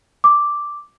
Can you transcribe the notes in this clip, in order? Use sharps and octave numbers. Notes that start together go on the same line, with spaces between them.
D6